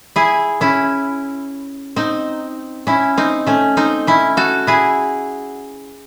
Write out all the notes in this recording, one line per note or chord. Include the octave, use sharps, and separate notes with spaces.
E4 G#4
C#4 E4
C4 D#4
C#4 E4
C4 D#4
A3 C#4
C4 D#4
C#4 E4
F#4 A4
E4 G#4